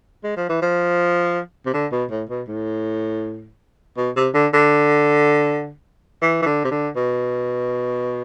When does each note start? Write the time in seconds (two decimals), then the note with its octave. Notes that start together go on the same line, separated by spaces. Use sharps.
0.24 G#3
0.37 F3
0.49 E3
0.62 F3
1.66 C3
1.74 D3
1.92 B2
2.11 A2
2.29 B2
2.48 A2
3.97 B2
4.16 C3
4.34 D3
4.54 D3
6.22 E3
6.42 E3
6.46 D3
6.65 C3
6.71 D3
6.96 B2